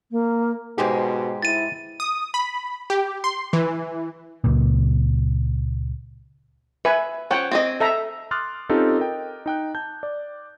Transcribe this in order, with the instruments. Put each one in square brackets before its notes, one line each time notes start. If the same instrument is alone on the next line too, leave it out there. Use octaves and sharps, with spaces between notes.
[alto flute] A#3
[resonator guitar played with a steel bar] G#2 G#3 G4 [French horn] B2 [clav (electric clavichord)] G#4 C5
[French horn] E4 [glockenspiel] A6 D#7
[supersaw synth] D#6
B5
G4
C6
E3
[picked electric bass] C#2 A#2
[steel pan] B4 G#5 [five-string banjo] E5
[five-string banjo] F3 C#4 [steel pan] F#5 G5
[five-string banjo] C4 G#4 D#5
[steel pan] A4 E5 A#5
[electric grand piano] C6 D6 D#6 F6 F#6 A6
C4 C#4 D#4 F4 G4 A4
A#4 D#5 G5
D#4 G5 F#6
A5 G6
D5